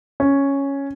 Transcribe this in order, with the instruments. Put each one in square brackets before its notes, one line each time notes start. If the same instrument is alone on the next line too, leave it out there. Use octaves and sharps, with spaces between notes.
[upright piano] C#4